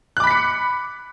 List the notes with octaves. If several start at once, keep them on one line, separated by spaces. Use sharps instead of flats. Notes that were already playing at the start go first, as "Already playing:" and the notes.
B5 D6 F#6 B6 C#7